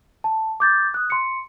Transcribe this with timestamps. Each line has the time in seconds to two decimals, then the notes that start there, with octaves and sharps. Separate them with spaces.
0.24 A5
0.60 D6 G6 A6
0.94 D#6 F#6
1.10 C6 C#7